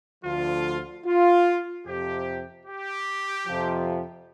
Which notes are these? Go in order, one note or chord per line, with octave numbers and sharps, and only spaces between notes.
D2 D3 F3 F4
F4
F2 C3 F3 G4
G4
F2 C3 F3